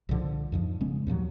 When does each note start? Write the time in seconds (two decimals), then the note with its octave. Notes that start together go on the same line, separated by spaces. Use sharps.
0.09 C2 A#2 D3 F3
0.52 F2 G#2 F3
0.81 C#3 G#3 B3 C#4
1.07 D#2 A#2 F3 F#3